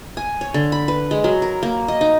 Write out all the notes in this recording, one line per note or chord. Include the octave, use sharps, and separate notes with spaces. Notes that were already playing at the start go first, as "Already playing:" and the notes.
G#5
C#5
D3
B5
B4
G#3
F#3
A#4
A#3
D#5
D#4